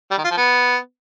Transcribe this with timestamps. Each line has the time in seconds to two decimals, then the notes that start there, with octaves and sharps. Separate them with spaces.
0.11 G3
0.18 D#3
0.24 F4
0.31 F3
0.37 B3